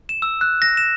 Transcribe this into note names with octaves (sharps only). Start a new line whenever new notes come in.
E7
E6
F#6
A#6
E7